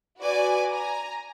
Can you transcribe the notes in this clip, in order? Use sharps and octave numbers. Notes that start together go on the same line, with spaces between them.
F#4 B4 D5 G#5 D6
G#5 A#5